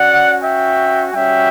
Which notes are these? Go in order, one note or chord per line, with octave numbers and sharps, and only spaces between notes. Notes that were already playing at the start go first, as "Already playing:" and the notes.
Already playing: C#4 F#4 D5 F#5
E5 G5
G3 C#4 F#4 E5 G5